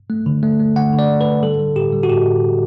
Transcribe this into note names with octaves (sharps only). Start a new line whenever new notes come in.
A3
D3
A3
A3
D3 F#5
D3
D5
A3
B4
D3
G3 A4
G3
A2 G4
G3
F#4
A2 G4